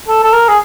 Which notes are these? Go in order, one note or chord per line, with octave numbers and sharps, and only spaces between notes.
A4
A4
A#4
G#4